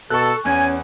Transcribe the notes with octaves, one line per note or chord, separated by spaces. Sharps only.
B2 A4 C#6 F#6
E2 C#4 G#5